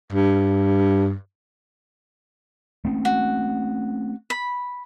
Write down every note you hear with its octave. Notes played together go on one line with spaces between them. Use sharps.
G2
A3 C4 C#4
F#4
B5